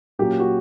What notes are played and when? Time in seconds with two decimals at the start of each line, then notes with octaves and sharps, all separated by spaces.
0.19 A#2 F#3 A#3 C#4 G4
0.40 F#4